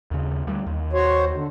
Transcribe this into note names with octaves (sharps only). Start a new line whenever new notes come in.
D#2 C#3
D2 G3
D#2
F#4 C5 C#5
D3